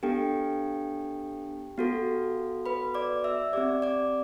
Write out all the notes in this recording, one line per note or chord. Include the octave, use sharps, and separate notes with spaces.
B3 D4 G4 A4 G5
B3 F#4 A4
B4 B5
D5 D6
E5 E6
C4 G4 D5 D6
D5 D6